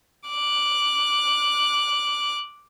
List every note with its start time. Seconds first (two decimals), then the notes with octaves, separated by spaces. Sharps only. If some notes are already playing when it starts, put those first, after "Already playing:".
0.28 D6 F#6